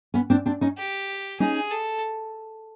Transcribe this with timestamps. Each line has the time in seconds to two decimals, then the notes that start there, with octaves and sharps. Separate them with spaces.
0.14 B3 C#4
0.30 C4 D4
0.46 C4 D4
0.61 C#4 D#4
0.78 G4
1.40 C#4 D#4 G#4
1.71 A4